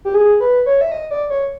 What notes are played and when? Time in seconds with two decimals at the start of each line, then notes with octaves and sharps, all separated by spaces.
0.05 G4
0.14 G#4
0.40 B4
0.66 C#5
0.81 E5
0.92 D#5
1.11 D5
1.30 C#5